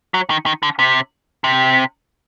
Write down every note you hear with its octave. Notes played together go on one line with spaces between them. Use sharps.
F#3
D#3
D#3
D3
C3
C3